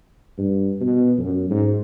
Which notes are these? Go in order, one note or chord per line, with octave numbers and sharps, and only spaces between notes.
G2
B2
F#2
G#2